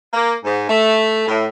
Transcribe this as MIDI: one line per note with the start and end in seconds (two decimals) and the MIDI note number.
0.14 0.34 58
0.44 0.66 44
0.69 1.26 57
1.28 1.46 45